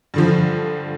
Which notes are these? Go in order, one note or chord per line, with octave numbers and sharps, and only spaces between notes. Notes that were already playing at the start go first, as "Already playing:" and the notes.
G2 D3 F3